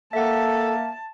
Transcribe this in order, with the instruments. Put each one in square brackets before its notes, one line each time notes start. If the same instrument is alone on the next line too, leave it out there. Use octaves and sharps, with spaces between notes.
[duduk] A#3 [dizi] A4 [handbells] E5 F#5 [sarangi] A5